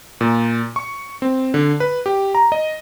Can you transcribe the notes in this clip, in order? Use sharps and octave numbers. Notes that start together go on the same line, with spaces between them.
A#2
C#6
C4
D3
B4
G4
A#5
D#5